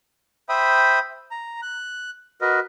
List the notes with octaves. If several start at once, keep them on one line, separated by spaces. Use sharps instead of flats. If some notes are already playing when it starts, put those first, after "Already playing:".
C5 E5 G5 B5 D#6
A#5
F#6
F#4 A#4 B4 D#5